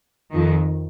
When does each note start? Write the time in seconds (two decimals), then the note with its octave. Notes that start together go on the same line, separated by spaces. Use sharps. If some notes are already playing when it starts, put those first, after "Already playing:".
0.32 F2 D#3